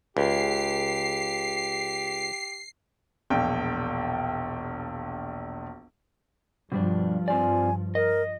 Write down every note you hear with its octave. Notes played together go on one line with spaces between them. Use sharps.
C#2 G4 C7
E1 A#1 G5
G2 B2 F3 G3 D4
C4 F4 D5 G#5
A#4 D#5